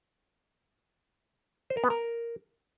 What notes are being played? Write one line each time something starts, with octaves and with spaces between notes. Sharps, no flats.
C5
A#4
B3
A#4